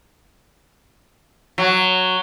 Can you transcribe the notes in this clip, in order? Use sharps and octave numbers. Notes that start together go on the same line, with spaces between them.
F#3